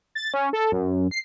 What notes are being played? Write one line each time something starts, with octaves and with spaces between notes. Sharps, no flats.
A6
C#4
A4
F#2
C7